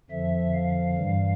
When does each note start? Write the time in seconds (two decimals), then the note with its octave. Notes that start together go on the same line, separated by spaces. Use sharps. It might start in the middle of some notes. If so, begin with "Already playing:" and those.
0.10 F2 D3 F3 E5
0.54 F5
0.97 G2 E3 G3